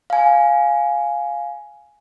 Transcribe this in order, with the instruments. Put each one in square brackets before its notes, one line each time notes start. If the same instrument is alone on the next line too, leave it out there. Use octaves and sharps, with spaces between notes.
[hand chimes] F5 G#5